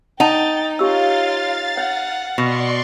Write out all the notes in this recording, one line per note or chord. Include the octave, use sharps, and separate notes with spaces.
D#4 F#5 G5 A5 A6
F4 G4 C#5 F5 E6 A6
C#5 F#5
B2 D5 C6 C#6